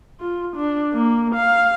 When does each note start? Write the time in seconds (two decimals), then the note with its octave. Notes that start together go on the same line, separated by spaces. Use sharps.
0.20 F4
0.56 D4
0.94 A#3
1.34 F5